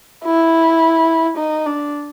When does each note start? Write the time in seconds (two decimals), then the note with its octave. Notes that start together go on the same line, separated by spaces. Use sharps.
0.25 E4
1.37 D#4
1.66 D4